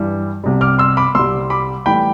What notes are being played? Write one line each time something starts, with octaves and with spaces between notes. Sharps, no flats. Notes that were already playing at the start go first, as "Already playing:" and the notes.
Already playing: G2 E3 G3
C2 C3 G3
D6 F6
C6 E6
B5 D6
C2 C3 G3 C6 E6
B5 D6
A2 E3 G3 G5 B5